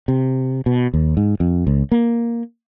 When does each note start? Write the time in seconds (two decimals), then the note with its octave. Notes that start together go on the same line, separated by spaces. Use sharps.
0.08 C3
0.66 B2
0.94 D#2
1.17 G#2
1.40 F2
1.67 C#2
1.92 A#3